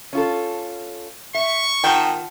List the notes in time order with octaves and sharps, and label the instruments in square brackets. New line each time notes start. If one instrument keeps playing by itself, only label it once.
[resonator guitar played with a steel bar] C#4 F4 A4
[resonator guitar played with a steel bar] E5 [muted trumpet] C#6
[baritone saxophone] D#3 [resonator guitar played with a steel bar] F4 F#5 A5 [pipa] G5